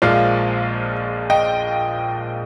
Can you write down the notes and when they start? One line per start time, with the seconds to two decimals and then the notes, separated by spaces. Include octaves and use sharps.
0.02 A#1 A#2 F3 G#3 D5 F5
1.30 D#5 G5